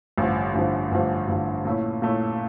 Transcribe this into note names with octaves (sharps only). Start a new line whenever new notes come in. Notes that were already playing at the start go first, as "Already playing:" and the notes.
A1 G2 D3 F3
A1 G2 D3 F3
A1 G2 D3 F3
A1 G2 D3 F3
A#2 A3 C#4 E4
A#2 A3 C#4 E4